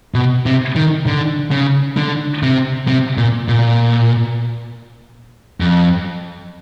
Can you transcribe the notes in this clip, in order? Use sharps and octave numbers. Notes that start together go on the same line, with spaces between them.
B2
C3
D#3
D3
C#3
D3
C3
C3
A#2
A#2
F2